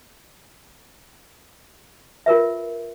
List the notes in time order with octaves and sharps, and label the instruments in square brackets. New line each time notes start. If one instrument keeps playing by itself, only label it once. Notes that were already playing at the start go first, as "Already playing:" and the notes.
[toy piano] F4 A#4 B4 E5